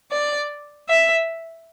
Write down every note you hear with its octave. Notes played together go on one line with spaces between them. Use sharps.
D5
E5